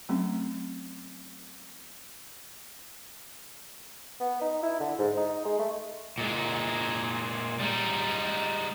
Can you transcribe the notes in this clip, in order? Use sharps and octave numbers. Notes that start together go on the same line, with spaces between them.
F#3 A3 C4 C#4
B3
D#4
E4
D3
G#2
D#4
G#3
A3
A#2 G#3
G3 G#3 D#4